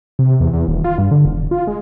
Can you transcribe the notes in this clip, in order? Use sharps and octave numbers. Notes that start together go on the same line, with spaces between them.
C3
E2
E2
D#1
F4
G2
D3
E1
F4
G#3